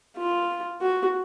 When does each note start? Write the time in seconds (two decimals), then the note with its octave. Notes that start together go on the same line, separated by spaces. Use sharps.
0.17 F4
0.82 F#4